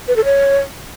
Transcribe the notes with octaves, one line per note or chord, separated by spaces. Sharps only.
B4
A4
C#5